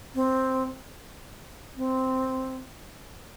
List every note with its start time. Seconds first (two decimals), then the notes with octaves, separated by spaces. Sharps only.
0.15 C4
1.77 C4